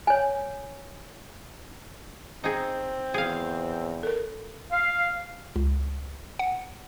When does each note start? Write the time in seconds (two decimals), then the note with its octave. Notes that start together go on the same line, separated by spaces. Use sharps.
0.07 C#5 G#5
2.44 C4 D#4 G#4
3.14 E2 G#4 F5
4.03 A4 A#4
4.72 F5
5.56 C#2
6.39 F#5